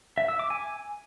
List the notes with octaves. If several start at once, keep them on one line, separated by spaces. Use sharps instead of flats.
E5
E6
D6
G#5